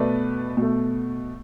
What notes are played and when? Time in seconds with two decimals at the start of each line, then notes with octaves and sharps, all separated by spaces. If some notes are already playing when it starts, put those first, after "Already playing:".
Already playing: B2 A3 B4 D5
0.57 B2
0.62 A3